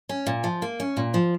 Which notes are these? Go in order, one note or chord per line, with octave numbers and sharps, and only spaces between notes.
C#4
A#2
F3
A#3
C#4
A#2
F3